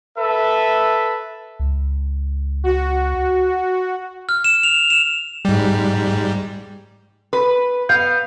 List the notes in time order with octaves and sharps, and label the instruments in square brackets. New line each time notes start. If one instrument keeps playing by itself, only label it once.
[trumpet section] A4 B4 E5
[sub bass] C#2
[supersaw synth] F#4
[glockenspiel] F6
E7
F7
E7
[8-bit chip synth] G#2 G3
[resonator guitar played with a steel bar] B4
[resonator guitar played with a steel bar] B3 F5 [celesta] G6